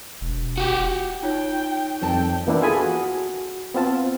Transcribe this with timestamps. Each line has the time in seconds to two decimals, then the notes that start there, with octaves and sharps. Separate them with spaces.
0.21 E1
0.58 F#4 G4
1.22 D#4 F4 C#5 G5
2.02 F2 C4 G5 A5
2.47 E3 A#3 B3 D4 E4
2.61 F4 G#4 A4 G#5 B5 D#6
2.77 F#4
3.75 B3 C4 F4 A5